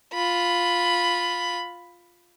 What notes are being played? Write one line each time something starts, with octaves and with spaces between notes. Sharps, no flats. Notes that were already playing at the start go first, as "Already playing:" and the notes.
F4 B5